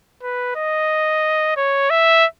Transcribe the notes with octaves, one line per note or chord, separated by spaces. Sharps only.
B4
D#5
C#5
E5